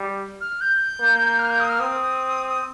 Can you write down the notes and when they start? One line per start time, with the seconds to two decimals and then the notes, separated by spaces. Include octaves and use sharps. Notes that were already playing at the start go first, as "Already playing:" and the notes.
Already playing: G3
0.41 F6
0.61 G6
1.00 A#3
1.39 F6
1.50 G6
1.60 D#6
1.69 F6
1.80 C4 D#6
2.48 D#6